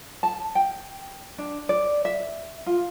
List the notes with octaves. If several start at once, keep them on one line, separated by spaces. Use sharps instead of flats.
A5
G5
D4
D5
E5
F4